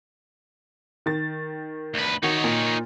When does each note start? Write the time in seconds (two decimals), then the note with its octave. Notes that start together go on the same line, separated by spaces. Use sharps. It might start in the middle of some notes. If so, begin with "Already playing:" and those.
1.06 D#3 A6
1.94 D2 B4
2.23 D#3 D#4 F#4 C#5
2.44 A#2